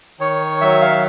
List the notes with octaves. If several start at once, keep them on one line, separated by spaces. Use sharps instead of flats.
D#3 C#5
F#3 E5
F5